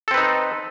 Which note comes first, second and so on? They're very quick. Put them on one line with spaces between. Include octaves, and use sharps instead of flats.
A4 C4 B4 D#4